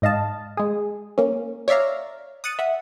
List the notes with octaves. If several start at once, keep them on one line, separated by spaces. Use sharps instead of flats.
G#2 D#5 F5 A5
G#3 G#4
A#3 C#4
C#5 D5 E5 F5 A#5
D#6 F#6 A6 C#7 D#7
E5 F#5